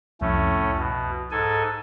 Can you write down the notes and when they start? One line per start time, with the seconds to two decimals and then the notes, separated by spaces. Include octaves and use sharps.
0.21 C2 F2 A2 A3 C#4
0.79 B2
1.31 G#2 A4 G#5